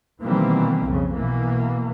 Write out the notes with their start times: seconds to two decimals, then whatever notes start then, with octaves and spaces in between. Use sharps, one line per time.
0.22 B2 D#3 E3 G3 A#3 C4
0.84 B1 F2 C#3
1.12 B2 E3 A#3